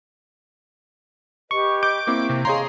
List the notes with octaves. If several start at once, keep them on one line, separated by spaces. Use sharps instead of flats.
G4 B4 D#5 C#6
D6 G6
A#3 C4 E4 C#6
C3
G#4 C#5 D#5 F5 A#5 C6